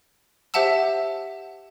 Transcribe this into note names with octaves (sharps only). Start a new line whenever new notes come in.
G4 C5 E5 F#5 A5 E6